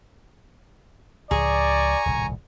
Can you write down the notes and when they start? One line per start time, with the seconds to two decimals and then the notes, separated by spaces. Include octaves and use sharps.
1.31 C#2 A2 F3 G#4 D5 G#5 A#5 C#6
2.06 D#1 C2 A2